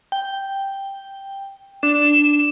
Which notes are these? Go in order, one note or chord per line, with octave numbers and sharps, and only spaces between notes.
G5
D4 E7